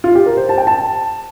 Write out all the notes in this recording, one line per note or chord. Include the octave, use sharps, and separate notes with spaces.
F4
G4
A#4
C5
A5
G5
A5